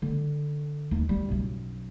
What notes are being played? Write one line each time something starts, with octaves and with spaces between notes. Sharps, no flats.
D3
D#2
G3
B1 F#2